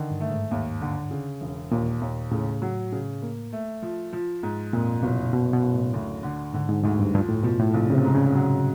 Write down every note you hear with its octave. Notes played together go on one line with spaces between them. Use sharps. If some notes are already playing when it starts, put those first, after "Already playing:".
Already playing: D3 D#3
G2
A3
G#2
D#2
D3
C#3
E1
D#2 A#2
D#2
A2 C#3
F#3
C#3
A#3
A3
F3
F3
G#2
F2 A#2
F#1 B2
F#1 B2
B2
F#1
A2
D2
D3
G#2 D3
G#2
D2 G#2
G2
G2 F3
A2
B2 F3
A2
A#1 C3
C#3
C3
G#2
C#3
F#3